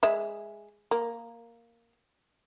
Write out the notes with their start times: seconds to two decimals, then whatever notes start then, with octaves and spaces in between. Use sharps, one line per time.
0.03 G#3 E5
0.91 A#3